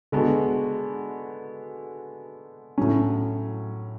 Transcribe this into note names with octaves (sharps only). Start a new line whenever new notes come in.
D3 G#3 B3 F#4
A2 F#3 C#4